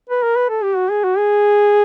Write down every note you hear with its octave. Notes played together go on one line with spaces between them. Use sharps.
B4
A#4
B4
A4
G4
F#4
G#4
F#4
G#4